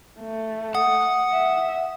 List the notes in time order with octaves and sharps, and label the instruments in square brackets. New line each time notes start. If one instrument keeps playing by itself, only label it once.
[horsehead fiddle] A3
[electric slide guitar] F#5 [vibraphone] D#6
[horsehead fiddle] E5